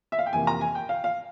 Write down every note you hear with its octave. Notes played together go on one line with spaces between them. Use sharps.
E5
F5
G5
F2 C3 E3 A#3 G#5
A#5
G#5
G5
F5
F5